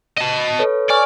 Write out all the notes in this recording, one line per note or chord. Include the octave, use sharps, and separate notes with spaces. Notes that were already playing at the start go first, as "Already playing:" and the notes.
D#5 A5
A4 B4 C#5
D5 G#5 C#6 F6